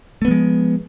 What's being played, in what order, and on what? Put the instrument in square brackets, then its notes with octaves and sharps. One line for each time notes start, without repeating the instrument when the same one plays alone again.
[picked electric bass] A3
B3
F3
G#3